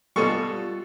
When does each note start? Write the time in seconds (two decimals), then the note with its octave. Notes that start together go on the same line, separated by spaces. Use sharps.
0.16 B2 G3 F4 A4 C#6